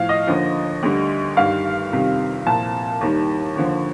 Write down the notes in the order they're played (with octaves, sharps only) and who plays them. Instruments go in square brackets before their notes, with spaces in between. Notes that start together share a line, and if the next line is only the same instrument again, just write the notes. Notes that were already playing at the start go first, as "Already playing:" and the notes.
Already playing: [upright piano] A2 F3 F5
D#5
D#2 D3 F3
D2 D3 G3
G2 D#3 G3 F5
F2 C3 D#3 G3
C2 A#2 F3 A5
D#2 D#3 G3
D#2 D3 F3